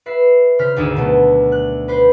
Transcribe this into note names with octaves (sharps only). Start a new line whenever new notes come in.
B4 E5 C7
C#3 C5 F6 B6
G#1 D2 D#4 G#4 E6
B2 F#3 A3
F#6
B4 C5